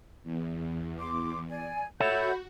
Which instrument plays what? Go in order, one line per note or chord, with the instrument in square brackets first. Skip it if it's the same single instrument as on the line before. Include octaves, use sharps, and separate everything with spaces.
[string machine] E2
[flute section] C6 D6
D5 G#5
[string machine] F#4 [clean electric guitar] A4 C#5 E5 [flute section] F#5 B5 G6